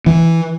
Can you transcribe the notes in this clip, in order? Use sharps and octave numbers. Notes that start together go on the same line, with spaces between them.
E3